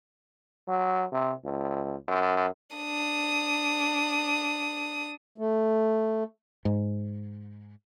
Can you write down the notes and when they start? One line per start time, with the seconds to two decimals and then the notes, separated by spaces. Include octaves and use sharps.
0.68 F#3
1.12 C3
1.45 C#2
2.08 F#2
2.76 D4 D#6
5.38 A3
6.65 G#2